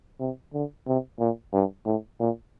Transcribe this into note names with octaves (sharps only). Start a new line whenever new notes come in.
C3
D3
C3
A#2
G2
A2
A#2